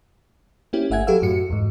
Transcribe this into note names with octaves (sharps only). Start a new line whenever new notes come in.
A#3 C4 C#4 E4 G4
G1 A3 E5 F#5 G#5 G#6
F#3 G4 A4 B4 F5 E6
F#2 A2 F#4 C#7
E2 G#2